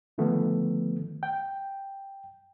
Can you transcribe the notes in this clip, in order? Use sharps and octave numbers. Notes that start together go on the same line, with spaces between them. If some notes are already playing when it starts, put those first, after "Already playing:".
D3 D#3 F3 A3 B3
G5